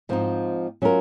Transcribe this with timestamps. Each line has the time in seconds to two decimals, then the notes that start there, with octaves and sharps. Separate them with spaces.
0.09 G#2 F3 C4 D#4
0.82 F#3 C#4 F4 A#4